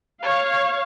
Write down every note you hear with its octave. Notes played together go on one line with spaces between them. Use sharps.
C#5 F5